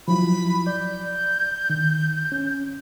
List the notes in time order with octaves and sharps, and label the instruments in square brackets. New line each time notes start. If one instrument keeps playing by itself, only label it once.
[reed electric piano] F3 F#3 E4 [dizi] B5
[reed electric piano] D5 [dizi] G6
[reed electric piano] D#3
C#4